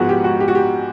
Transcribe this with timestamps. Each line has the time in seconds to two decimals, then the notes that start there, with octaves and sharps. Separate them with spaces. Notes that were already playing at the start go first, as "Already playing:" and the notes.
Already playing: G#2 F3 G#3 B3 F#4
0.09 G4
0.24 F#4
0.40 G4
0.48 F#4
0.55 G4